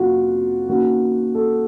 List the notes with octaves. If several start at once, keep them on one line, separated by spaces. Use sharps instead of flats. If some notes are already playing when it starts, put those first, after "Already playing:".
Already playing: F2 C3 F#3 A#3 C#4 F4 F#4
D#3 A#3 C#4 F#4
A4